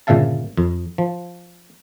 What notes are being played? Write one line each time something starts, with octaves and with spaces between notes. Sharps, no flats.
G1 A#2 C#3 E5 F5 A5
F2
F3